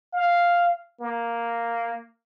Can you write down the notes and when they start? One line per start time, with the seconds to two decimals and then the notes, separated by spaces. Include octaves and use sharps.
0.13 F5
1.01 A#3